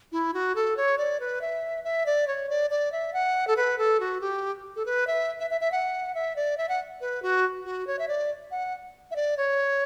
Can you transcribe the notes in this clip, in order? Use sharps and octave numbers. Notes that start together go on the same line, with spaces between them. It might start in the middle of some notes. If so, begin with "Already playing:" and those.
E4
F#4
A4
C#5
D5
B4
E5
E5
D5
C#5
D5
D5
E5
F#5
A4
B4
A4
F#4
G4
A4
B4
E5
E5
E5
E5
F#5
E5
D5
E5
F#5
B4
F#4
F#4
C#5
E5
D5
F#5
E5
D5
C#5